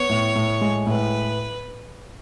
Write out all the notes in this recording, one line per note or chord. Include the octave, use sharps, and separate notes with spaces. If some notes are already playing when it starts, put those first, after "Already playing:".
Already playing: B3 C#5
A2
A2
G#3
A2 B4